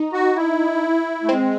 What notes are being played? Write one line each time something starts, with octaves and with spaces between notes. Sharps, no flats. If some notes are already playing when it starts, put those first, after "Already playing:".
Already playing: D#4
F#4
E4
A3
G#3 C4